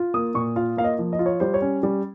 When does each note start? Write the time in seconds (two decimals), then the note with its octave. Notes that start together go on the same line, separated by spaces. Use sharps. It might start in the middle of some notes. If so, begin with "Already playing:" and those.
Already playing: F4
0.14 A#3 D#6
0.34 A#2 C#6
0.56 F4 F5
0.77 A#3 F5
0.84 D#5
0.99 F3
1.13 D#5
1.19 F4
1.26 C#5
1.40 G3 C5
1.54 C#5
1.62 C#4
1.83 G3